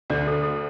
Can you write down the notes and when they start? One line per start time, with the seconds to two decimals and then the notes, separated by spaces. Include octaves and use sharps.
0.10 D2 D3 D5
0.27 A4
0.43 A4